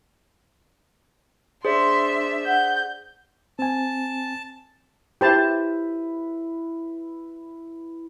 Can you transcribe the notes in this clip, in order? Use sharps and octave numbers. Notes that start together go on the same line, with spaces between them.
D4 G#4 C5 D5 E5 C6
F#5 G6
C4 G#5 A5
E4 G4 B4 C5 A5